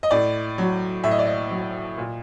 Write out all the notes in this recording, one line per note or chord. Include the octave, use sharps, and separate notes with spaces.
D#5
A2 D5
F#3
A2 E5
D#5
D5
D#5
F#3
A#2